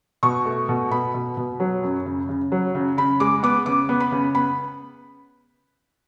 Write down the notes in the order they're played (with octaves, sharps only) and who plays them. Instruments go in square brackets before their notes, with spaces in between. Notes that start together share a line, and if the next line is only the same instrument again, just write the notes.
[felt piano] B2 C#6
A3
B2
B2 B5
B2
B2
F#3
F#2
C#3
C#3
F#3
C#3
C#3 B5
G#3 D6
B3 D6
C#3 D6
B3
B5
C#3
B3 B5